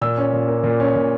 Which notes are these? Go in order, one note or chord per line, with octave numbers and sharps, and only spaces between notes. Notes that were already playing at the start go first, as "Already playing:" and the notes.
A#2 E6
C#4
A#2
A#3
A#2
C#4
A#2